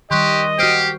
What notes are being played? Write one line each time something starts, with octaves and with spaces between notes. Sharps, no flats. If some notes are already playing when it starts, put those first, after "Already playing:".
D#3 G3 G4 D#5 C6 C#6 F#6
F#4 G4 C5 F6 C7 D7